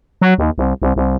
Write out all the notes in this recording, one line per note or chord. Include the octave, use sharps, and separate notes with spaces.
F#3
D#2
C2
C2
C2